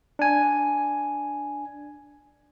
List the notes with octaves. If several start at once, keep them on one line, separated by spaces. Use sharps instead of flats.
D4 G#5